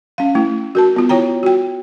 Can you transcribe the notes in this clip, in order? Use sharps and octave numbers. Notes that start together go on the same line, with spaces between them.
C#4 F5
A3 E4
F#4 A#4 A5
B3 F4
E4 F4 C#5 G5 A#5
F#4 G5